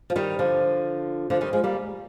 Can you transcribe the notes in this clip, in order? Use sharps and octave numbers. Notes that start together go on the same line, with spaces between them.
F3
D#3 G3
D3 F3
D3 F3
D#3 G3
F3 G#3
G3 A#3